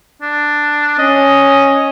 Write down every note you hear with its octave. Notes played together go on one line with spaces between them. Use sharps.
D4
C#4 D#5